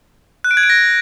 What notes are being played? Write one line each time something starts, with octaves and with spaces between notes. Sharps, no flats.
F#6
D7
G#6
D7
A#6